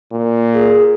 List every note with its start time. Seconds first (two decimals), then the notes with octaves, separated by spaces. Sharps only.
0.13 A#2
0.54 G#4